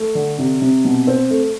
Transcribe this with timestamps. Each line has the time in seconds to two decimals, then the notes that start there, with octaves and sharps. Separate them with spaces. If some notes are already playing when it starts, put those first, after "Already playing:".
Already playing: A3
0.15 D3
0.38 C3
0.62 C3
0.85 B2
1.07 C4
1.30 A3